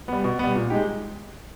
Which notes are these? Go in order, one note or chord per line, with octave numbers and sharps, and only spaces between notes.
G3 B3
B2
G3 B3
A#2
G#3 D#4 G4